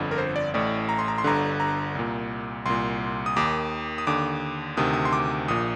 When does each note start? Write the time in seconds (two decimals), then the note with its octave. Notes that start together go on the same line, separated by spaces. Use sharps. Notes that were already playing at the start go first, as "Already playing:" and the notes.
Already playing: G1 F2 D3
0.11 A#4
0.18 C5
0.36 D5
0.54 A1 A2 D5
0.89 A#5
0.99 C6
1.08 A#5
1.18 C6
1.24 G1 G2 D3 A#5
1.60 A#5
1.95 C2 A#2
2.66 C2 A#2 C6
3.26 D#6
3.36 D#2 D#3 D6
3.98 D#6
4.07 D#2 D3 D6
4.77 D2 C3 D#3 D#6
4.93 D#6
5.05 C6
5.13 D6
5.48 A#1 A#2 D#6